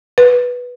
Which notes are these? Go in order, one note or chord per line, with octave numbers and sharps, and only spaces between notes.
B4